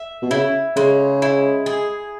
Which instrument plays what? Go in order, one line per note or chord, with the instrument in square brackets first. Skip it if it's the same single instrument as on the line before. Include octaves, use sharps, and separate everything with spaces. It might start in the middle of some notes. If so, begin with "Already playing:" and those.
Already playing: [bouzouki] E5
[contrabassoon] B2
[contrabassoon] C#3 [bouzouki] E4
[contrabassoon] C#3 [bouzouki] G#3
[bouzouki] E4
G#4